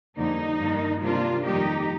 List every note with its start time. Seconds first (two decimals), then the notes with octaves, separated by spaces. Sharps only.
0.17 F2 D3 G3 A#3 D#4
0.59 G2 D#3 A#3
1.03 C3 G3 A#3 D4 F4
1.45 F2 D#3 G3 A#3 D#4 G4